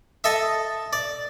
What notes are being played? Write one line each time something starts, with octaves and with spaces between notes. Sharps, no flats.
A4 D#5 E5
D5